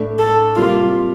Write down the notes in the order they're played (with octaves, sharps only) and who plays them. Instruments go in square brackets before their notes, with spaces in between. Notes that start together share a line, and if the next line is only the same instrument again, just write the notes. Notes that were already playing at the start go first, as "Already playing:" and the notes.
Already playing: [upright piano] A2 A3 D4
[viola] A4
[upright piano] C3 G3 A#3 [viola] F4